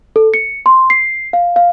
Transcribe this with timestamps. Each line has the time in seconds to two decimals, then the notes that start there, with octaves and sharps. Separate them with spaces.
0.16 A4
0.34 C#7
0.66 C6
0.90 C7
1.33 F5
1.56 F5